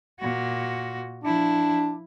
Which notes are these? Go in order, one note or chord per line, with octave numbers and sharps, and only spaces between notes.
A#2 F#4
F3 D4 E4